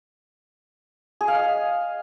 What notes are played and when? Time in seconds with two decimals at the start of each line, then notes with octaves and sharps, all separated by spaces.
1.21 G#4
1.28 F5
1.35 D#5